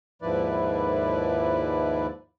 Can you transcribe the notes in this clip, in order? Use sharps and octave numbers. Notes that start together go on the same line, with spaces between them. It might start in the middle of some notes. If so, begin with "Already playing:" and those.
D#2 G#2 F3 E4 B4 D5